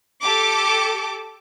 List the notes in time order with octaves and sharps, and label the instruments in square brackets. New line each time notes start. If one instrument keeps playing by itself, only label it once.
[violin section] G4 A4 D6